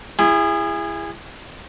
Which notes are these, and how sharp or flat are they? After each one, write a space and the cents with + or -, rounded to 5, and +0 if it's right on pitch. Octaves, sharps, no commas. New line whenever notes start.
E4 +20 G#4 -25